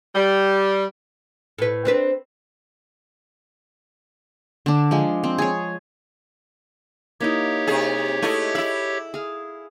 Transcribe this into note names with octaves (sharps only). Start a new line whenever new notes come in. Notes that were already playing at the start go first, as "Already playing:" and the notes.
G3
A2 B4
C4 D4 B4
D3 D4
F3 G#3
C4
G#4 C#5
A#3 D#4 E4 G4 C#5
C3 G#4
A3 E4 D#5 F#5 G#5
E4 E5 B5
G#4 F5